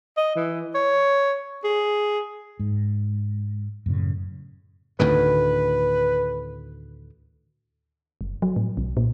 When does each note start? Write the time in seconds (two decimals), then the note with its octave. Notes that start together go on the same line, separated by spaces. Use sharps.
0.17 D#5
0.36 E3
0.75 C#5
1.64 G#4
2.60 G#2
3.86 F#2 A2 C#3
5.00 D2 A2 D#3 B4
8.21 F#1
8.42 F#3
8.56 A2
8.77 B1
8.97 A#2